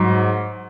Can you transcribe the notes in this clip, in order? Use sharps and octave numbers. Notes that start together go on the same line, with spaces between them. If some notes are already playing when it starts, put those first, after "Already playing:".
Already playing: G#2 F#3